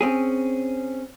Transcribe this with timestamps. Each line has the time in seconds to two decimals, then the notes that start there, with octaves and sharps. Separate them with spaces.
0.01 C4 C#4 G#4